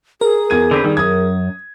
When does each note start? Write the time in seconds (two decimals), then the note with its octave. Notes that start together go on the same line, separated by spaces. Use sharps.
0.21 G#4 A#4
0.50 E2 G#6 D#7
0.71 D3 C4 B4
0.84 D#3 G3
0.97 F#2 D#6 G#6